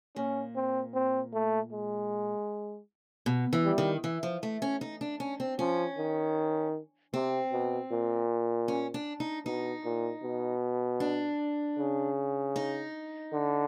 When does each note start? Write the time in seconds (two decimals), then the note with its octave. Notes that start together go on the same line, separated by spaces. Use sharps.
0.16 A#2 C#4
0.56 C4
0.94 C4
1.33 A3
1.72 G#3
3.26 B2
3.53 E3
3.65 G3
3.78 D#3
4.04 E3
4.23 F3
4.43 A3
4.62 C#4
4.81 D#4
5.01 D4
5.20 C#4
5.40 C4
5.59 F3 C#4
5.98 D#3
7.14 C3 C4
7.52 B2
7.91 A#2
8.68 C#4
8.94 D4
9.20 D#4
9.46 B2 D#4
9.85 A#2
10.23 B2
11.00 D4
11.78 C#3
12.56 D#4
13.33 D3